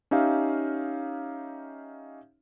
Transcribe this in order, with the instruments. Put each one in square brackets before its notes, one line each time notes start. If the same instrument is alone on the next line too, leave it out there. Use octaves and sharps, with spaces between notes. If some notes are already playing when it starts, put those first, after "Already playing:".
[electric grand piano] C#4 D#4 G4 E5 F5